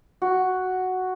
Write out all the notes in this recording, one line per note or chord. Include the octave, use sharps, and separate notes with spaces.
F#4